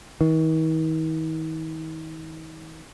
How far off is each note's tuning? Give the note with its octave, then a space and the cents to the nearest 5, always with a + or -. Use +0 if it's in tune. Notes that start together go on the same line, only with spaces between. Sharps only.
D#3 +45